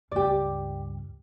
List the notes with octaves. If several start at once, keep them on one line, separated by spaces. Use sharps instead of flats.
C#2 G2 G4 D5